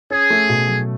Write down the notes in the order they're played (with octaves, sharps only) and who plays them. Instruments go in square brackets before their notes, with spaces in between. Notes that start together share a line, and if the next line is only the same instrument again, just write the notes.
[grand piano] C#4 [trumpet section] G#4
[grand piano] A3
B2
F#3